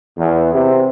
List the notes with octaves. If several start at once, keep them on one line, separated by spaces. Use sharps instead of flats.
E2
C3